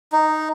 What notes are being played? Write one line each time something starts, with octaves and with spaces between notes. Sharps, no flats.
D#4